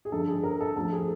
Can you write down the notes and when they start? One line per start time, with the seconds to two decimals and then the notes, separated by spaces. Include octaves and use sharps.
0.05 G#4
0.12 G2 D3 F3 A4
0.28 G#4
0.43 A#4
0.61 A4
0.76 D2 D3 F3 A4
0.92 G#4